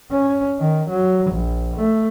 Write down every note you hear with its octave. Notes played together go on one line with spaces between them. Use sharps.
C#4
D#3
F#3
A#1
A3